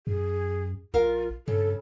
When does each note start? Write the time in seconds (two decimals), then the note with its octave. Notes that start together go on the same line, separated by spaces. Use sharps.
0.07 F#2 G#4
0.94 A#1 F4 A#4 F5
1.48 G2 C#3 A4